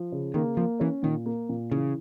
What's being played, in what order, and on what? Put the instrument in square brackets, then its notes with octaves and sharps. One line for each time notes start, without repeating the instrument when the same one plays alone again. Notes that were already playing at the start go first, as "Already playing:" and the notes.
Already playing: [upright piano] F3
C#3
[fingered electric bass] D#3 [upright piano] A#3
[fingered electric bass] F3 [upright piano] A#3
[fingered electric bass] E3 [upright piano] C#4
[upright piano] A#2 [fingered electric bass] D#3
[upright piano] A#3
A#2
[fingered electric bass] C#3 [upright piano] E3